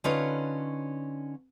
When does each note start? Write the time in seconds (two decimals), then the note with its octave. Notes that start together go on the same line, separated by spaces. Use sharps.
0.04 D3 C#4 D#4 F4 B4 C#5